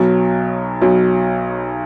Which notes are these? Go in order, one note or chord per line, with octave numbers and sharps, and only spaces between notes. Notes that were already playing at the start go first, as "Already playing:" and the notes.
Already playing: B1 B2 F#3
B1 B2 F#3